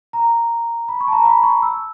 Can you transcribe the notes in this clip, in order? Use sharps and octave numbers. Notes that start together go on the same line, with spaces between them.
A#5
B5
C#6
A5
A#5
B5
C#6
E6